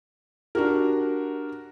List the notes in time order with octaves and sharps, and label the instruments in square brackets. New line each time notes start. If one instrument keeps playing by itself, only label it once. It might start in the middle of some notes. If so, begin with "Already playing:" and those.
[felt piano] D4 F#4 G4 A#4